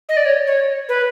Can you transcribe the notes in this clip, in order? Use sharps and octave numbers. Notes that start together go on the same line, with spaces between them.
D#5
D5
C#5
C#5
B4